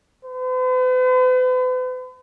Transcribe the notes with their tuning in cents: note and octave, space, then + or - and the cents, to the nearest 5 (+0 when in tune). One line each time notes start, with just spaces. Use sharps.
B4 +45